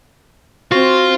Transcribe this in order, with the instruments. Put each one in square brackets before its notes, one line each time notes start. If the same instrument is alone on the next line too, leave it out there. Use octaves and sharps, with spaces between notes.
[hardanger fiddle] C4 [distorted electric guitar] F4 [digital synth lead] F#4